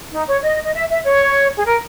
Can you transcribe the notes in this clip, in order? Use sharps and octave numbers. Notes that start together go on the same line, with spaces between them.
D#4
C#5
D#5
D#5
E5
E5
C#5
G#4
A#4